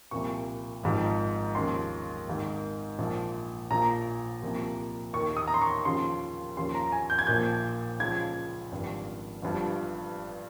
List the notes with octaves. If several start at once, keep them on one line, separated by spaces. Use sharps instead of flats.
C2 A#2 F3 C#6
G#1 G#2 F3
D#2 C#3 F3 C6
G#1 G#2 D#3
A#1 A#2 F3
A#1 A#2 F3 A#5
C2 A#2 F3
D#2 D#3 C#6
D#6
A#5
C6
C#6
D#2 C#3 F3 C6
D#2 C#3 F3 C6
A#5
G#5
G6
G#6
A#1 A#2 F3 G6
C#2 C#3 F3 G#6
G#1 G2 F3
G1 G2 F3